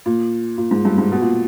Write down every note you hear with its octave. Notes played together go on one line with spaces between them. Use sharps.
A#2
A#2
G#2
G2
G#2
B2
A#2